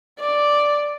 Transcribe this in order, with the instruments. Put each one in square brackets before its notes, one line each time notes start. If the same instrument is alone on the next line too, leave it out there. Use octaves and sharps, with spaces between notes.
[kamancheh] D5